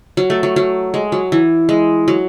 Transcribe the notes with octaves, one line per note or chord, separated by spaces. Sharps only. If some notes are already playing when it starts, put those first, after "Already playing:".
F#3
A3
F#3
F#3
G#3
F#3
E3
G#3
F#3